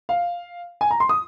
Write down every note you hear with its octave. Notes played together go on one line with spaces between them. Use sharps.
F5
G#5
A#5
C6
D#6